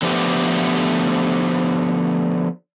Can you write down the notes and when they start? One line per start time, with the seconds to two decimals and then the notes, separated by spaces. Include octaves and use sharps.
0.02 D3 F3 A3 B3 G4